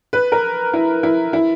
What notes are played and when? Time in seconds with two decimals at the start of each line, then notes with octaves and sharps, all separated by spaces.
0.13 B4
0.32 A#4
0.73 E4
1.03 E4
1.33 E4